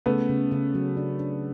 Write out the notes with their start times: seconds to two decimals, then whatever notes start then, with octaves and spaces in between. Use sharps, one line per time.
0.06 C#3 A3 B3
0.29 C#3
0.51 C#3
0.75 F#3
0.97 D4
1.20 D4